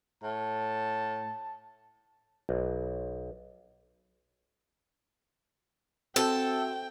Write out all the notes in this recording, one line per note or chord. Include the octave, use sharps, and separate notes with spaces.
A2 A5
B1
C4 F#4 A4 E5 G5